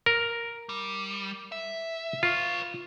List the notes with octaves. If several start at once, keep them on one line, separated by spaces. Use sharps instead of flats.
A#4
G3
E5
F4 B4 C#5